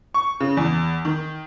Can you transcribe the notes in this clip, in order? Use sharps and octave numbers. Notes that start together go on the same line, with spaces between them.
C#6
C#3
E2
D#3